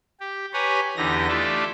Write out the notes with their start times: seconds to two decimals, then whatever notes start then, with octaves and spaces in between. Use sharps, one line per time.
0.20 G4
0.53 G4 B4 C#5 G#5 A#5
0.97 E2 D3 E3 D#4 G4 A#6
1.28 A3 D4 E4 F4 G4 A4